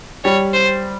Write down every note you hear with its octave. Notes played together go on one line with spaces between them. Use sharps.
G3 C#5
C5